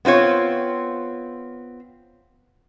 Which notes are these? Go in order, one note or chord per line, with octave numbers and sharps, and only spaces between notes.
B3 C4 F4 C#5